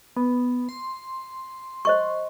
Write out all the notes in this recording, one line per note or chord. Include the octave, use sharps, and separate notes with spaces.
B3
C6
C5 D#5 C#6